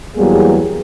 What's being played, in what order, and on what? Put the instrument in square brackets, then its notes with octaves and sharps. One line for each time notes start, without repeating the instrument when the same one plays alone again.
[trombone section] E2 F#3 G3 A#3 B3 G#4